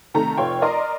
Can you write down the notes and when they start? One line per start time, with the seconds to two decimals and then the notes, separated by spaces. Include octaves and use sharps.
0.14 C3 D#3 A3 A#5
0.37 F1 F4 C#5 G5
0.62 A#4 D5 D#5 A#5 C6